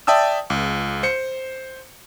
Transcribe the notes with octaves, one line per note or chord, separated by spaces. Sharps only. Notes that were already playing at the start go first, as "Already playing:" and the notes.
D5 E5 G5 A5 D#6 E6
C#2
C5 C#7